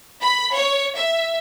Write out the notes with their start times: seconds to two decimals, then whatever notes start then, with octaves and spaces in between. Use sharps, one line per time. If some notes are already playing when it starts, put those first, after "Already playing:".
0.21 B5
0.52 C#5
0.97 E5